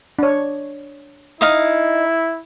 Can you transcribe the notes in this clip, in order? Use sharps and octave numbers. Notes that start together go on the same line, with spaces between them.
D4 C#5
D#4 E4 F5 D#6